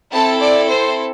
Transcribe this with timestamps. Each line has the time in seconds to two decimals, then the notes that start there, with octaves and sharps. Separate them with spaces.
0.12 C4 E4 A4 A5
0.40 D5
0.69 C5